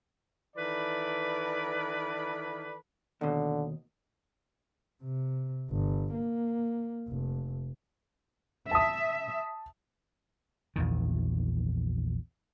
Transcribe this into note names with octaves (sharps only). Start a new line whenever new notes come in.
D#3 E3 A4 B4 D5 B5
D#2 B2 D3
C3
G1
A#3
F1
E5 A5 D#6
A#1 E2 D#3